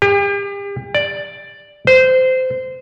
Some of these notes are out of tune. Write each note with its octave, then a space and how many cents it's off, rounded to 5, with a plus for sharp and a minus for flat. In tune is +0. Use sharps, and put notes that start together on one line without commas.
G4 +40
D5 +5
C5 -20